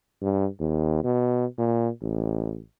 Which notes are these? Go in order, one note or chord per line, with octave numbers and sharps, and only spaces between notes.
G2
D#2
B2
A#2
A1